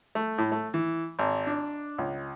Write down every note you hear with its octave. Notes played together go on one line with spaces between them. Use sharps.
A3
A2
A3
E3
G#1
D4
C#2